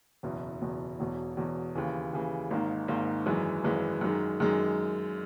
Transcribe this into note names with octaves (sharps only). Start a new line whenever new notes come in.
F#1 E2 B2
F#1 E2 B2
E1 E2 B2
E1 E2 B2
D#2 C#3 E3
D#2 C#3 E3
G#1 G#2 D#3 A#3
G#1 G#2 D#3 A#3
G#1 F#2 E3 G#3
G#1 F#2 E3 G#3
F#2 D#3 G#3
F#2 D#3 G#3